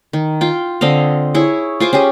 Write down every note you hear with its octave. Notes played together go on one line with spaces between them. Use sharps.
D#3
F4 G5
D3 C4 D#5 F5
E4 G#4 C#5
F4 C5 G#5 D6
C#4 F4 G4 G#4